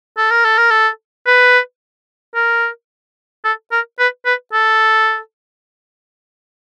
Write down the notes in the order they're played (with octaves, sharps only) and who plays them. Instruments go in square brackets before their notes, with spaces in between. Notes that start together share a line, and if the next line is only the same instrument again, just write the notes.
[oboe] A4
A#4
A4
A#4
A4
B4
A#4
A4
A#4
B4
B4
A4